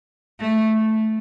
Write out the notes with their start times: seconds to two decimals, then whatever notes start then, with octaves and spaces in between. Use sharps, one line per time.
0.40 A3